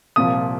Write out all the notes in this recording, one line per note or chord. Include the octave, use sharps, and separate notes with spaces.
C2 A#2 F3 D#6